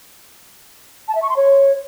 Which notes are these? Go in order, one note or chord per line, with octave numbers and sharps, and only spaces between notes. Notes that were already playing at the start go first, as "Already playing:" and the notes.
A5
E5
C#6
C6
C#5